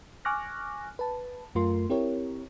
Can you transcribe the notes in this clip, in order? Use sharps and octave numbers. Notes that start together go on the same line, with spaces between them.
G#5 C#6 D6 F6 F#6 A#6
B4 A5
F#2 A3 F4 A#4 C6
C4 E4 G4 A#4 C#5